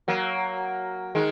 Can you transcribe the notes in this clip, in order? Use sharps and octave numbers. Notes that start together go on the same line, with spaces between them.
F#3 A#3
D#3 G#3